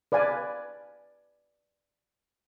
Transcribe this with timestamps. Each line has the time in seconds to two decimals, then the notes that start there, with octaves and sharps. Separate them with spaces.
0.12 B4 D5 F5 G#5